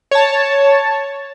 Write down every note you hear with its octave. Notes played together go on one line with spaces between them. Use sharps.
C#5 A5